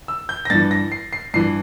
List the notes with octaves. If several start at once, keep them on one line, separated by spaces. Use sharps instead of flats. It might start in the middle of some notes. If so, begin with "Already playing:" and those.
E6
G6
A#6
G2 E3 A6
A#6
C7
C7
G2 E3 C7